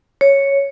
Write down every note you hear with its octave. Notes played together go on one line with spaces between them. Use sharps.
C#5